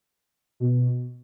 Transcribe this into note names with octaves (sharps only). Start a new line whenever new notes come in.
B2